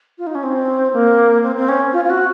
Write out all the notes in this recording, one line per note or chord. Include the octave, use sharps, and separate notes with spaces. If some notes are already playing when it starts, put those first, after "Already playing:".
F4
D#4
C#4
C4
A#3
C4
C4
C#4
F4
F4
F#4